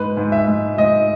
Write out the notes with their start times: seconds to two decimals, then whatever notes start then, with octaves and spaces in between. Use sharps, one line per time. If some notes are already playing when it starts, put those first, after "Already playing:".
Already playing: G#2 B4
0.17 G#2
0.32 E5
0.48 G#2
0.78 G#2 D#5